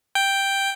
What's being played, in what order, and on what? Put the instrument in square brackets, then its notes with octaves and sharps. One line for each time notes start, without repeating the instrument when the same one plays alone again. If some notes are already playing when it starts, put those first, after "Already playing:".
[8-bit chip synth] G5